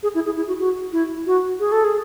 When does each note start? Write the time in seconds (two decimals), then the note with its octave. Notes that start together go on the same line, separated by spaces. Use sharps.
0.03 G#4
0.15 E4
0.25 G#4
0.37 E4
0.48 F#4
0.59 F#4
0.92 E4
1.26 F#4
1.60 G#4
1.72 A4
1.84 G#4